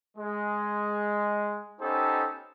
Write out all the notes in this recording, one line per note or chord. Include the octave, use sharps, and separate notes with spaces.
G#3
B3 C#4 D#4 G4 A4 C5